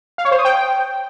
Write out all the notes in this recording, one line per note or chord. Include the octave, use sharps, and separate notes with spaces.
F5
C#5
C5
D#6
G5